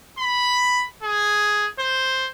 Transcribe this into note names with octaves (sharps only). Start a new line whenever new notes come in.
B5
G#4
C5